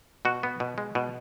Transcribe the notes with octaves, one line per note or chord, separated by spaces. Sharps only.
B2 F#4
B3
B2
G#3
B2